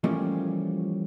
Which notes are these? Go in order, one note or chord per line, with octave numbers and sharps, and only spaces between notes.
E3 F3 G3 A3 A#3 C#4